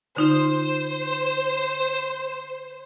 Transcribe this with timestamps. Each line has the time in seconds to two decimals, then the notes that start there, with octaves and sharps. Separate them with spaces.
0.17 D3 D#4 F4 C5